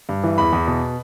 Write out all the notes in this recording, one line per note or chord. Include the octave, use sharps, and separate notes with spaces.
G2
E3
E2 B5
E2
B2